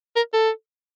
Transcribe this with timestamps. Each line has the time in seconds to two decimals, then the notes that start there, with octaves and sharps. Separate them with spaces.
0.16 A#4
0.34 A4